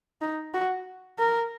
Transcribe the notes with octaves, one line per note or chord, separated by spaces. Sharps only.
D#4
F#4
A#4